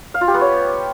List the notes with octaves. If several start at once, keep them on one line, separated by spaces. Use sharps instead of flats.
F5
F4
G4
B3
C#5